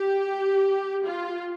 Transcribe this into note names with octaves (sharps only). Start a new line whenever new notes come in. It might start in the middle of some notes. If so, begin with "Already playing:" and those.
Already playing: G4
F4